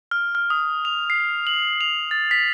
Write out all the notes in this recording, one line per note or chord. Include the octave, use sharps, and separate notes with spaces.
F6
F6
D#6
F7
C7
F#7
F7
A6
B6